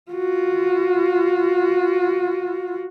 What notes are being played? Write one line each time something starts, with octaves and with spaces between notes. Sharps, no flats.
F4 F#4